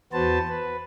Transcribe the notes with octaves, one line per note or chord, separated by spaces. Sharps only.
E2 B3 F#4 B4 C5 A5
B4